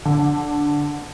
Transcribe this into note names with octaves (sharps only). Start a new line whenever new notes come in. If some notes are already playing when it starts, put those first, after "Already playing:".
D3